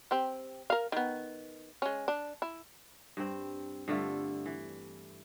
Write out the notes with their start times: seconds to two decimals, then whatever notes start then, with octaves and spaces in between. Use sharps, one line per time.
0.11 C4 G4
0.70 A#4 F5
0.92 D#3 B3
1.82 G#3 C#4
2.08 D4
2.42 E4
3.17 G2 C4
3.88 G2 D3 A3 F4
4.46 E3